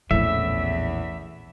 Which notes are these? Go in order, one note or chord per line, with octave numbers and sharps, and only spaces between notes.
A#1 E2 A2 E3 C#4 E5